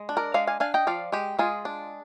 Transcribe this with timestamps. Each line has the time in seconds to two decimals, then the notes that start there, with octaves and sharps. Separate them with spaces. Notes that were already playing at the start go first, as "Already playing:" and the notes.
Already playing: G#3
0.09 D4
0.17 A#4 D5
0.34 G#3 D5 F5
0.47 F5 G#5
0.60 D4 F5 G#5
0.74 D#5 G5
0.87 F3 D5 F5
1.12 G#3 G4
1.39 G#3 F4 G#4
1.65 D4